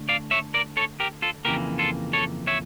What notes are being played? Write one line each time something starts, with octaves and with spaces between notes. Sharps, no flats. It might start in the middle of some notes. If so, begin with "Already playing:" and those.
Already playing: D3 A3
D5 F5
C#5 E5
A#4 D5
A4 C#5
G4 A#4
F4 A4
F2 C#3 E3 A#3 G4 A#4
F4 A4
A4 C#5
C#5 E5